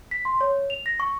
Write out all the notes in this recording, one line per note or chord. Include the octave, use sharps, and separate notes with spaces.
B6
C6
C#5
F7
A#6
C#6